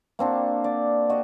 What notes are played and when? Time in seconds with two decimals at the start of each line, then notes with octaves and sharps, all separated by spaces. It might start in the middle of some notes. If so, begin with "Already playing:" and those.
0.19 A#3 C4 D4 F#4
0.64 D5
1.10 F#4 G4 D#5